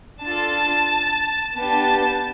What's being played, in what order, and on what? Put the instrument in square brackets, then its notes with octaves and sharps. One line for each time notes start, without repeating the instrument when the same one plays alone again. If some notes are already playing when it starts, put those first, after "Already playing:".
[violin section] D4 F4 A4 A5
B3 D4 G4 A5